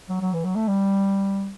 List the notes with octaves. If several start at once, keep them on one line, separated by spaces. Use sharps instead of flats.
F#3
F#3
E3
F#3
A3
G3